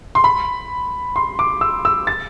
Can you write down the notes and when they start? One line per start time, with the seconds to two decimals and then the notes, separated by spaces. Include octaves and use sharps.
0.15 C6
0.24 B5
1.16 C6
1.39 D6
1.61 E6
1.85 E6
2.07 A6